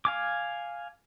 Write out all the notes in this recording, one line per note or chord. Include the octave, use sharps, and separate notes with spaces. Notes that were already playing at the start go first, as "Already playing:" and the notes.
F5 G#5 D6